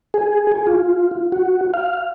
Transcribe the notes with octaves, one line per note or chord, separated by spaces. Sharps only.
G#4
G#4
F4
F#4
F5